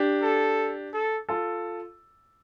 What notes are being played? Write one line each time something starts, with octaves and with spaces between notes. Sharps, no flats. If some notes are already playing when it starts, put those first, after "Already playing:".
Already playing: D4 G4
A4
A4
F4 A4